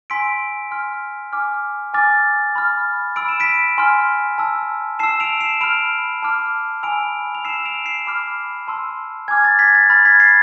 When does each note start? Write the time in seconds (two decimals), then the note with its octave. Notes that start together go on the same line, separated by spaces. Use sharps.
0.10 G#5 C6 E6 B6 D7
0.71 G#5 C6 F6
1.33 G#5 D6 F6
1.94 G#5 D6 F6 A6
2.55 B5 F6
3.16 B5 E6 D7
3.29 E7
3.40 B6 D7
3.78 G#5 C6 F6
4.38 A5 E6
4.99 A5 C7 E7
5.03 E6
5.20 D7 F7
5.41 C7 E7
5.61 B5 F6 D7 F7
6.22 A5 D6 F6
6.83 G#5 B5 E6 D7 F7
7.35 F7
7.45 E6 C7 E7
7.48 A5
7.65 D7 F7
7.85 C7 E7
8.07 B5 D6 F6
8.68 A5 C6 E6
9.28 G#5 D6 F6 G#6
9.44 A6
9.59 G#6 B6
9.75 A6
9.90 B5 F6 A6
10.05 G#6 B6
10.20 A6 C7